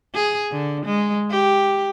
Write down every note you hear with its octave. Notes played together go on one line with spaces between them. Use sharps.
G#4
D3
G#3
G4